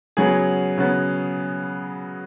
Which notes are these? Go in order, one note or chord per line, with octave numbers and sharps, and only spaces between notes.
C#3 F#3 B3 G#4
C#3 F#3 B3